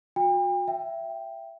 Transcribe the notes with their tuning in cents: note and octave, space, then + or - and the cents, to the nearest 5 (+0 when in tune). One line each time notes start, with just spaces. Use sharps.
F#4 -35 G5 +40
E5 +20 G5 +0